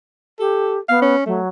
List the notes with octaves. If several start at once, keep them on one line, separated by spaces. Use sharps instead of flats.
G4 A4
B3 F5
C#4
F#3 A3